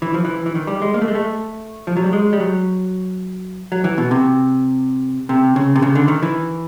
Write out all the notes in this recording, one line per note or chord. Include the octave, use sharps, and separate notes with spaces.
E3
F3
E3
E3
D#3
G3
G#3
A#3
A3
G#3
A3
F3
F#3
G3
G#3
G3
F#3
F#3
E3
B2
C3
C3
C#3
C3
C#3
D3
D#3
E3